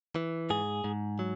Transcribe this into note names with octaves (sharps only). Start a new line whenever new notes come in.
E3
G#2 G#4
G#2
F#3